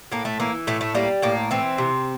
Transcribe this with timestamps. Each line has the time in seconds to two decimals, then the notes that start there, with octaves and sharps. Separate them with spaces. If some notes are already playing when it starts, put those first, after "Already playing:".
0.12 A2 A#3
0.25 A3
0.40 E3 A#3
0.67 A2 A3
0.81 A3
0.95 G3 A#3
1.22 A2 A#3
1.51 E3 C4
1.78 C3